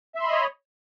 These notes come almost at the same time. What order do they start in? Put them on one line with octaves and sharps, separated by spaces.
E5 C6 B5 D#5 C#5